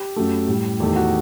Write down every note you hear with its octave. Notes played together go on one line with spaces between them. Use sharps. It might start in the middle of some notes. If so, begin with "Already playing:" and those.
Already playing: G4
F#2 F#3 A3
A2 G3
E2 D#3 A3 G4
F#4